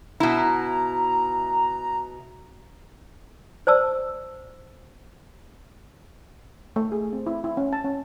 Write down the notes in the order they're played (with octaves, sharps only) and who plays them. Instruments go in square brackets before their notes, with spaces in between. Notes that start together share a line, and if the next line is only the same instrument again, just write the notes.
[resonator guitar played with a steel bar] B2 E4 [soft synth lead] A#5
[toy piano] C5 D5 A5 E6
[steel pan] A3
G#4
C4
E4
E4
C#4
A5
C#4